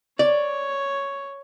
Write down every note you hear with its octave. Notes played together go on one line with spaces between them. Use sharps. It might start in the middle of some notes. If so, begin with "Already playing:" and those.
C#5 D5